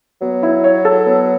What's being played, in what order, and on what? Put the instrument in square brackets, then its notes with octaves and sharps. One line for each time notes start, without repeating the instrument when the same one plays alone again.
[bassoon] F#3 [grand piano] B3
[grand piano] E4
C#5
A4
B3